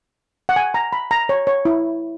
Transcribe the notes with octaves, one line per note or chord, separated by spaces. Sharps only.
F#5
G#5
A#5
B5
A#5
C#5
C#5
E4